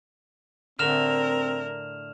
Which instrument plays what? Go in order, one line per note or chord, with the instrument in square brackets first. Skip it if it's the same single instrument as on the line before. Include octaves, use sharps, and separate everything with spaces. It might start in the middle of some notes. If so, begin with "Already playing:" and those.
[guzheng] A2 D3 [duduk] C4 [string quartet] A#4 [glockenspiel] F6 E7 F7